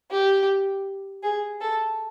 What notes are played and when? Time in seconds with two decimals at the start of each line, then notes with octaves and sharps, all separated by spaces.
0.11 G4
1.23 G#4
1.60 A4